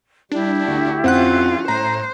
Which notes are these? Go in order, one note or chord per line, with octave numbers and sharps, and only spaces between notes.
G3 D4 E4 G4
D2 F#4
F2 C4 C#4 F4 F#5 F#6
A2 C5 A#5